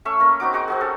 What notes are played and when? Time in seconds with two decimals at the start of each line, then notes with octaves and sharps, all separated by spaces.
0.05 A3 C#4 E5 C#6
0.19 A#3 C#4 A#4
0.40 C4 D#4 F#4 D6
0.53 D#4 F#4 G#4
0.68 C4 F#4 G#4
0.81 C#4 G4 A4